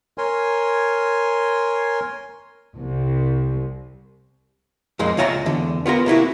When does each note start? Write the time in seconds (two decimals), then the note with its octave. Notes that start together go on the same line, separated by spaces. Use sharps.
0.18 A#4 C#5 G#5 C6
2.77 C2
4.99 F2 A#2 G#3 A#3
5.17 C#2 F4 C#5 E5 A#5
5.46 E2 D3
5.86 B3 F4 G#4 A#4
6.06 C3 A#3 E4 F#4